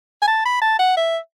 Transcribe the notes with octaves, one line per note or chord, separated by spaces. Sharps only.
G#5
A5
B5
A5
F#5
E5